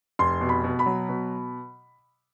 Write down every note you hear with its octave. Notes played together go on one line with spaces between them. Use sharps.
F1 C6
B2
B5
B2
B5
F#3
B2